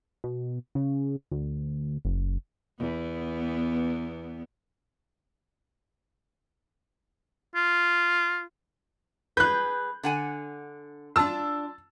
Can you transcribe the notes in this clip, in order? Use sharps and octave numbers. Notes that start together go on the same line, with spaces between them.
B2
C#3
D2
F#1
E2 B3
F4
G#4 B4 F#6 G6
D3 F#5 G#5
D4 F4 A5 E6